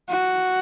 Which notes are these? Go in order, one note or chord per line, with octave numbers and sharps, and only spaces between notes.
F#4